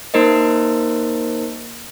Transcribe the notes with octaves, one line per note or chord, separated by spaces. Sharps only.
A#3 D#4 A#4 C5 D#5